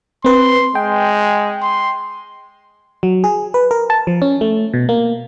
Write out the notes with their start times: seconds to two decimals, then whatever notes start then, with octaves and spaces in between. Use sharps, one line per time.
0.25 C4 B4 C6
0.75 G#3 G5
1.62 C6
3.03 F#3
3.24 G#4
3.54 B4
3.71 A#4
3.90 A5
4.07 F3
4.22 C#4
4.41 A3
4.74 B2
4.89 A#3